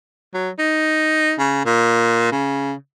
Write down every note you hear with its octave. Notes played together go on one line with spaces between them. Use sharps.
F#3
D#4
C#3
A#2
C#3